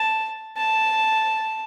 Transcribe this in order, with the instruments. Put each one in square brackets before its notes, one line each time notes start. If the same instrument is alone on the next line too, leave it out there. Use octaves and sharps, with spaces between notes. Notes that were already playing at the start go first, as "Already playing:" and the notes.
Already playing: [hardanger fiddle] A5
A5